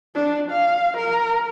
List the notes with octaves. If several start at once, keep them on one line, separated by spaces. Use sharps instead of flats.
D4
F5
A#4